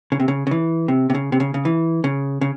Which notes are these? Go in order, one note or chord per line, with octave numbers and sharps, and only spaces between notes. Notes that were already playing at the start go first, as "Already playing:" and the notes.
C#3
C3
C#3
C#3
E3
C3
C3
C#3
C3
C#3
C#3
E3
C#3
C#3